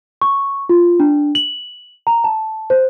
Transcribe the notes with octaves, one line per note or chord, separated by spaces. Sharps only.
C#6
F4
D4
F#7
A#5
A5
C5